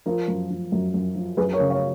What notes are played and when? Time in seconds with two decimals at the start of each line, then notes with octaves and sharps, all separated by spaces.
0.06 F3 A#4
0.28 F#2
0.50 F3
0.72 F#2
0.94 F#2
1.15 F3
1.37 F#2 G#4 B4
1.53 A#4 C#5
1.60 C#3
1.70 C#5 F5